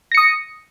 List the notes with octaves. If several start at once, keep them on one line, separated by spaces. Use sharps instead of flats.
D#6 A#6 C#7